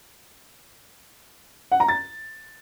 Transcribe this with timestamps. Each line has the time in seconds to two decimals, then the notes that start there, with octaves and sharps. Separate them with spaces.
1.72 F#5
1.80 A#5
1.88 A6